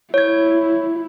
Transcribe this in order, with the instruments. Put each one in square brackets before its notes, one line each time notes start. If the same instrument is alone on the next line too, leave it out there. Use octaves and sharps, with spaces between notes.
[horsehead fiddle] E4 [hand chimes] C#5 G#6